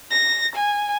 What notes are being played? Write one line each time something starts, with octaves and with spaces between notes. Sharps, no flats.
A#6
G#5